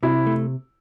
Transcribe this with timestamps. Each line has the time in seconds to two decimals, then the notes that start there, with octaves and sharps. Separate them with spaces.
0.03 C3 E4
0.26 A3